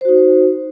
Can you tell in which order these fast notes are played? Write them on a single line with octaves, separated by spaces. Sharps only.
C5 F#4 D#4